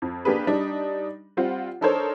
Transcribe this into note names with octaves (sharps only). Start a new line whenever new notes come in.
F2
A#3 D4 G4 G#4 B4
G3 D4 D#4
G3 C4 F4 F#5
D4 D#4 A4 A#4 C5 C#5